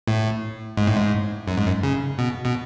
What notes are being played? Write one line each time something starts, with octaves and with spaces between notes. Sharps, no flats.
A2
G#2
A2
G#2
F#2
G#2
F#2
C#3
B2
B2